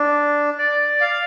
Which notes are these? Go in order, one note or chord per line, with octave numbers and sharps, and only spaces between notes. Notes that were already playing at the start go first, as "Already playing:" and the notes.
Already playing: D4
D5
F5